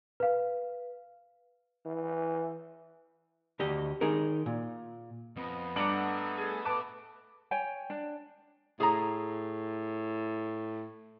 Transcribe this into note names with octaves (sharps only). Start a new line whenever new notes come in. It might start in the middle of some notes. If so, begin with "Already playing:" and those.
B4 F5
E3
D2 G4 D#5
D#3 D#4 G#4 A#4
A#2
F2 B3 D#5
G2 A3 D4 F#5 A#5 D6 F#7
G#4 A4
B4 A5 D6
C#5 G5 G#5
D4
A2 G#4 A#5